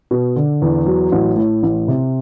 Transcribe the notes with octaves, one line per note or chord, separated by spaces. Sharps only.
B2
D3
E2
F#3
A1
A2
A1
C3